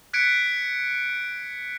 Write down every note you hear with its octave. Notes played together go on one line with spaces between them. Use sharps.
F#6 G#6 B6 C#7 D7